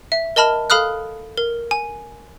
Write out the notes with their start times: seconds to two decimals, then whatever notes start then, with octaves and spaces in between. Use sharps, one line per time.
0.12 E5
0.36 A#4 D#5 A5 B5 F6
0.70 A4 F5 B5 D#6 F6 F#6
1.37 A#4
1.71 G#5